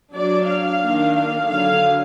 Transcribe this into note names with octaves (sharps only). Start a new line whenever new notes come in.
F#3 D4 D5
F5
D#3 A#3 D4
F5
D3 F#3 D4 F5